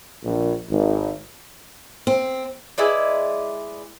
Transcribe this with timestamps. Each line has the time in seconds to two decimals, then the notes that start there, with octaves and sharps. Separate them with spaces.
0.24 A#1
0.70 G#1
2.07 C4
2.78 G#3 E4 B4 D5